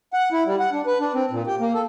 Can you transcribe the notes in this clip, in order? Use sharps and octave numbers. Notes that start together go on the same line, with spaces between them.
F#5
E4
G3
F#5
D4
B4
D4
C4
A#2
G4
A#3
A4